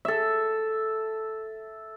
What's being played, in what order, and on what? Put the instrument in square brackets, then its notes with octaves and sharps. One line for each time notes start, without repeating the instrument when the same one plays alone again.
[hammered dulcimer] A4 E5